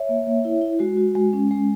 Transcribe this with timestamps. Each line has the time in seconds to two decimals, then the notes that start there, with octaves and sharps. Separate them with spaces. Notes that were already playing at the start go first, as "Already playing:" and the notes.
Already playing: C#5 E5
0.09 A#3
0.27 A#3
0.45 E4
0.61 E4
0.79 G#3 F#4
0.97 F#4
1.15 G#3
1.33 C#4
1.51 G#3